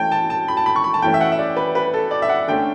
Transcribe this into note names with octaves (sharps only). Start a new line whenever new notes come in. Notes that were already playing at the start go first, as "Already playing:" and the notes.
Already playing: E3 A3 C#4 G5 A5
A5
A5
B5
A5
B5
C#6
B5
A5
E3 A3 C#4 G5
E5
F#5
E5
D5
B4
B4
A4
D5
E5
F#5
D3 A3 C#4 G5